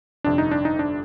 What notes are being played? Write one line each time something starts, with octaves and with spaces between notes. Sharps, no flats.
G1 F2 C3 D4
D#4
D4
D#4
D4